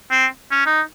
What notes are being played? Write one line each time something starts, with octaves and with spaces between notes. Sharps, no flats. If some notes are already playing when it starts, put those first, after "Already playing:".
C4
C#4
D#4